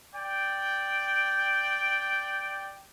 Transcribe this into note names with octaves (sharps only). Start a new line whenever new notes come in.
D5 G5